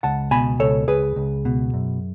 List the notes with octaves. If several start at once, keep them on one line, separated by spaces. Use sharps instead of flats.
C#2 F#5 A5
B2 G#5 B5
C#2 A4 C#5
C#2 G#4 B4
C#2
B2
F#2